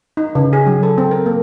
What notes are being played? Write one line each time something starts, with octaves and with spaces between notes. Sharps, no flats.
D#4
C#3
G#4
F#3
A4
C4
A#4
A#3